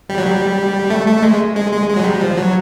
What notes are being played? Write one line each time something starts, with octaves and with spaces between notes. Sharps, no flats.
G3
F#3
G3
A3
A3
G#3
G#3
G#3
G#3
F#3
G3
F3
F#3